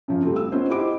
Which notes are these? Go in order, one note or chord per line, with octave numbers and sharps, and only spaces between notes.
F#2 C#3 F3
G3 A3 C4
E6
B3 C#4 F4 C5 D#5
E4 G4 C5 D#5 D6 D7